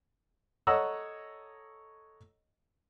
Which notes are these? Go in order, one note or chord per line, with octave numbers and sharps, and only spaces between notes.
A4 C#5 D#5 F#5 A#5 E6